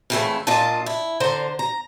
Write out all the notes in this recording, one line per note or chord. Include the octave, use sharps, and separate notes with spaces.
F2 A2 C#3 E3 A3 E4
A#2 D4 F4 D#5 A5
E4
D3 C5 A#5
A#5